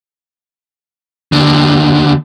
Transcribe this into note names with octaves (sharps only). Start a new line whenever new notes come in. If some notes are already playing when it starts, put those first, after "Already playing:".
D#2 D3